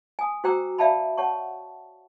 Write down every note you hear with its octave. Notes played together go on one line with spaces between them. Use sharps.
G#5 D#6
F#4 C5 G5 A#5 D6 E6
D5 E5 F5 G5 A5 B5
C#5 F#5 A5 C#6